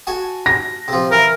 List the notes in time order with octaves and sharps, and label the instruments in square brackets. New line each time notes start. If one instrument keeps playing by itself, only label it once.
[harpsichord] F#4 G#5 A5
[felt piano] A#6
[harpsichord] C3 F3
[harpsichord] E3 [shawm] A#4